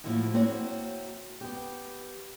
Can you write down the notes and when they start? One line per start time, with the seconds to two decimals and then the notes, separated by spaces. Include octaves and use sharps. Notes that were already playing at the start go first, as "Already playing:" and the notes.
0.04 A2 F3 G#3 A#3 E4 F#4
0.34 A#3 C4 E4 F#4 C#5 F#5
1.41 B3 G4